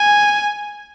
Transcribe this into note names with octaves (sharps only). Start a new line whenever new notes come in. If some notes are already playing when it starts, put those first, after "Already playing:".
Already playing: G#5